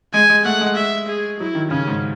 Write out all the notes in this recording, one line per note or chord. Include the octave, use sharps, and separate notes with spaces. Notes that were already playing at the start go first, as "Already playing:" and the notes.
G#3 G#5
G#3
A3 F#5
G#3
E5
G#4
F#3 E4
D#3
C#3 C#4
G#2